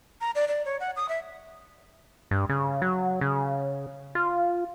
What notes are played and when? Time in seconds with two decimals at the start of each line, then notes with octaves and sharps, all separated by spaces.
0.21 A#5
0.35 D5
0.48 D5
0.65 C#5
0.80 F#5
0.96 D#6
1.09 E5
2.31 G2
2.49 C#3
2.82 F#3
3.21 C#3
4.15 F4